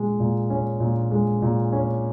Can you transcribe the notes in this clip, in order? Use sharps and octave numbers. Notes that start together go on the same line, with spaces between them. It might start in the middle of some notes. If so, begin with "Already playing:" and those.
Already playing: A#2 G#3
A#2
C#4
A#2
G#3
A#2
C#4